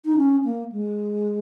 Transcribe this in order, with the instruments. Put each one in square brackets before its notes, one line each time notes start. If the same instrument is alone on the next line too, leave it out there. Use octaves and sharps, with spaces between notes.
[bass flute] D#4
C#4
A#3
G#3